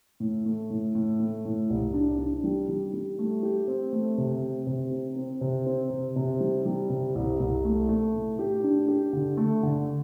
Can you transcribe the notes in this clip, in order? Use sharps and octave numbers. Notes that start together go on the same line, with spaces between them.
A2
A3
A2
A2
A3
A2
C2
D4
D4
G3
G3
G3
A3
G4
C4
A3
C3
C4
C3
C4
C4
C3
C4
C3
C3
G3
G3
C3
C2
C2
A3
A3
A2
G4
D4
G4
D3
A3
D3